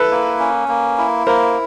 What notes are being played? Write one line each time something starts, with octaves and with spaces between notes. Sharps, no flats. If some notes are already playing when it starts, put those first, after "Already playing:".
Already playing: E4 A4 B4
A#3
C#4
A#3
E4
A#3 A#4 C5